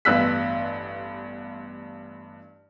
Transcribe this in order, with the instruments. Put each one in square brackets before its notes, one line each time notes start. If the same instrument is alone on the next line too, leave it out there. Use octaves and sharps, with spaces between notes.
[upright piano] A1 G2 B3 E6 F#6 B6